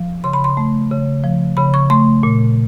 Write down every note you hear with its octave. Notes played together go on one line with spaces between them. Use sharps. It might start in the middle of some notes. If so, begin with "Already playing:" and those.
Already playing: F3
C#3 C6
B5
C6
A3
C#3
F3
C#3 B5
C#6
A3 C6
A#2